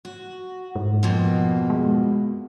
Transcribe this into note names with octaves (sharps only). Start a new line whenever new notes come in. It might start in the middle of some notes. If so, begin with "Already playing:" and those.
F#4
G#2
F2 B2 A#3
G#3